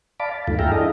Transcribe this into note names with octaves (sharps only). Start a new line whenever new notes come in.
D5 F5 A5 B5 D6
A5
D2 G2 D#3 A3 F4
G#4 E5 F5 G5 A#5
D4 E4 A4 D#5